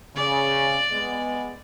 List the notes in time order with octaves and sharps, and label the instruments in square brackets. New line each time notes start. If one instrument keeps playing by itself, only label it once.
[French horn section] C#3 [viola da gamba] D5
[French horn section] G#3 B3